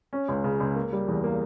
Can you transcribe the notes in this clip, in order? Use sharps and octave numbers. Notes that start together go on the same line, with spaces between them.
C#4
C#2
C#3
C#2
A#3
G3
E2
A#3